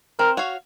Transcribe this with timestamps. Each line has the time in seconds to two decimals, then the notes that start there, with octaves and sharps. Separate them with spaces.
0.19 C4 A#4
0.37 F#4 C#5 F5